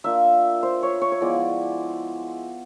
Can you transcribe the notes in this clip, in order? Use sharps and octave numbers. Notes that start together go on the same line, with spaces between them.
A#3 D4 F4 E5
C5
C#5
C#5
C#5
F3 G#3 B3 E4 D5